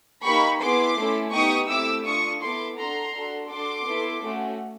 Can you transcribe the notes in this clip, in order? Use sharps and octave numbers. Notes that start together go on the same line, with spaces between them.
A#3 D#4 G4 B5 C#6
B3 E4 G#4 C6 D6
A3 C#4 E4 A4
B3 D#4 G4 C#6 D#6
A3 C4 E4 G4 D6 E6
D4 F4 A4 C#6 D#6
B3 E4 A4 C6 D6
D4 F#4 A4 A#5 C6
D4 F#4 A4
D4 F#4 A4 C6 D6
B3 E4 A4
A3 C#4 F#4 A4